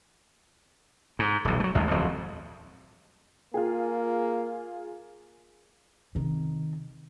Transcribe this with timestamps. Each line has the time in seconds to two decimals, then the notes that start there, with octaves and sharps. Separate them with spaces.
1.19 G#2
1.45 D#1 B1
1.60 F#3 A3
1.75 A1 D#2 G#3
1.91 D1 F2 F3 F#3
3.54 A#3 F4 G#4
6.15 C3 D#3